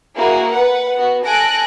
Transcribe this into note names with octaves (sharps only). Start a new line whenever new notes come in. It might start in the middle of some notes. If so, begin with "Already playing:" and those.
A#3 E4 F#4 G#4
B4 F#5
B3 F#4
A4 G#5 F#6 A#6 D7